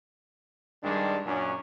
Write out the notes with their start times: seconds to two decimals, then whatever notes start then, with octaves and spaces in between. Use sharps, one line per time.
0.83 G2 D#3 G3 G#3 D4
1.26 F#2 A#2 C#4 D4